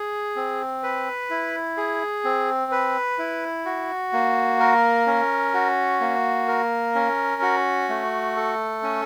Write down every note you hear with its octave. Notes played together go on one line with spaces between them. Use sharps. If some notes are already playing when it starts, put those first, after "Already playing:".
Already playing: G#4
C4
B4
E4
G#4
C4
B4
E4
F#4
A#3
A#4
C#4
F#4
A#3
A#4
C#4
F#4
A3
A4
C#4